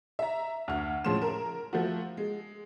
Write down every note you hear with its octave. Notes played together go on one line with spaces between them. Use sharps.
E5 A#5
D2 F6
A2 C#3 F3 G#3 C6 E7
A#4
F3 A3 F#4
G#3